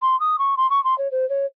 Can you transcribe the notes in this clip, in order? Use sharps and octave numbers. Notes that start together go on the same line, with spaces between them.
C6
D#6
C#6
C6
C#6
C6
C#5
C5
C#5